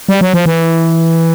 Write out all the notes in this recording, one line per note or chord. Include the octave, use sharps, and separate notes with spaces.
G3
F#3
F3
E3